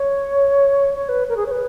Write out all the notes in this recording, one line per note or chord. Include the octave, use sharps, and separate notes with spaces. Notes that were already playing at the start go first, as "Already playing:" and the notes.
Already playing: C#5
C#5
B4
A#4
G#4
C#5
B4